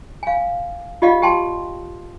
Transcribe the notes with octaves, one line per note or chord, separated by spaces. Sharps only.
F5 G#5
F4 G4 D5 D#5 F5 F#5
G4 G5 A5 C6